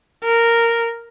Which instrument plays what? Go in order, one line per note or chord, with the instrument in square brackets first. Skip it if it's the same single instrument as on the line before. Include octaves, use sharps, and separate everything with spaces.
[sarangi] A#4